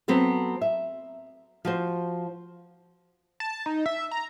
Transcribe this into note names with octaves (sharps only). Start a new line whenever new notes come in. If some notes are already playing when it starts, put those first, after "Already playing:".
F#3 B3 C4 A4 C5
E5
F3 F#4 C5
A5
D#4
E5
A#5